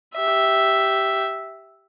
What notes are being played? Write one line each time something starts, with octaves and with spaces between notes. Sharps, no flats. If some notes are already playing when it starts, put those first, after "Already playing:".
G4 E5